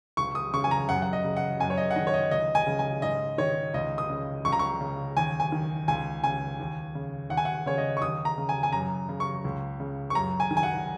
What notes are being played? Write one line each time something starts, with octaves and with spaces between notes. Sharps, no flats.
C#2 C#6
D#6
C#3 C#6
G#5
A#5
F#2 F#5
F#5
D#5
C#3
F#5
F#2 G#5
C#5
D#5
F#5
D#3 D#5
C#5
D#5
C#2 D#5
G#5
C#3
G#5
G#2 D#5
D#3 C#5
C#2 D#5
D#6
C#3
C#2 C#6
A#5
C#6
C#3
D#2 G#5
G#5
D#3
C#2 G#5
C#3 G#5
D#2
C#3
D#2 F#5
G#5
F#5
C#3 C#5
D#5
C#6
D#2 D#6
A#5
C#3
G#5
G#5
F#2 A#5
C#3
C#6
C#2
C#3
C#6
F#2 A#5
G#5
D#3
G#5
F#5